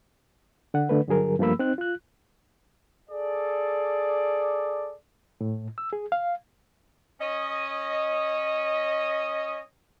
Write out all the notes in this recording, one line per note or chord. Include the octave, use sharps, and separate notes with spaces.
D3 F#5
D3 A3 B4
G2 D3 F#3 G#4 A#4
G2 F3 A3 A#3 B5 E6
C4 D#4 F#6
F4 F#6
G#4 A4 D5
A2
E6
G#4
F5
C#4 C#5 D#5